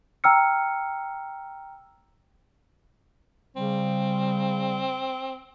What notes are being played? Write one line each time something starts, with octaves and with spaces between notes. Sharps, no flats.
G5 A#5 E6 F6 C#7
C#3 G3 C4